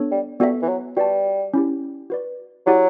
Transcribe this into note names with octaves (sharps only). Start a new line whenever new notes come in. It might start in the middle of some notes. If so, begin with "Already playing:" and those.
Already playing: B3 D4 A4 C#5
G3
G3 B3 F#4 A4 E5
E3
F#3
G3 F#4 B4 D5 A5
C#4 E4 G4
F#4 B4 D5
F#3 E4 G4 D5 F#5